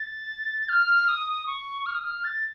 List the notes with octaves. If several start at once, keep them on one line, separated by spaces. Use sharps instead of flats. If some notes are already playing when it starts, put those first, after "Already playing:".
Already playing: A6
F6
D#6
C#6
F6
D#6
F6
A6